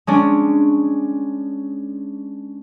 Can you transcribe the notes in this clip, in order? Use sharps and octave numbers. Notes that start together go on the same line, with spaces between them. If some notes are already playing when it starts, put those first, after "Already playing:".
G#3 C#4 D4